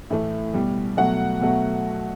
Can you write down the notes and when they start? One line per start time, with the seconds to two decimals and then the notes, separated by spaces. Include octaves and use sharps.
0.10 A2 E3 A3
0.54 B2 G3
0.97 B2 F#3 A3 F#5
1.41 B2 F#3 A3